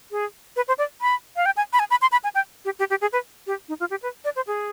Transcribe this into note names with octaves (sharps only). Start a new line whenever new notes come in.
G#4
B4
C5
D5
B5
F5
G5
G#5
B5
G#5
B5
C6
B5
G#5
G5
G4
G4
G4
G#4
B4
G4
D#4
F4
G4
B4
D5
C5
G#4